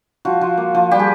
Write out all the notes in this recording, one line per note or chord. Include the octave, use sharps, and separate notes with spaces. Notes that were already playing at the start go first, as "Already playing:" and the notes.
F3 F#4
F3
A#3
F3
G3 G4
G#4